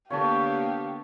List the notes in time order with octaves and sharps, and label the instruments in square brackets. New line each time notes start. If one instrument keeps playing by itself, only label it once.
[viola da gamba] D3 A#3 B3 [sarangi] G4 [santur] C#5 A5 [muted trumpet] F5